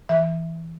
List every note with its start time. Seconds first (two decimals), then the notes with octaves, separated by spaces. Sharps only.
0.09 E3 E5